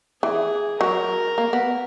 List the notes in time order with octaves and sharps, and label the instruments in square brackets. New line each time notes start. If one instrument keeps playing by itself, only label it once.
[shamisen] E3 [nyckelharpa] G#4
[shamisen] F#3 [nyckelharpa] A#4
[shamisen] A#3
B3